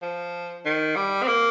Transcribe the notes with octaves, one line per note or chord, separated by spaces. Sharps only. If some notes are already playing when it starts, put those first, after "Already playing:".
F3
D#3
G3
C4
A#3